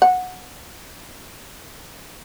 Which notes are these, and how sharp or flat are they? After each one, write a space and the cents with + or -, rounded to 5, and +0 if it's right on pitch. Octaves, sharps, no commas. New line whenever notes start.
F#5 -15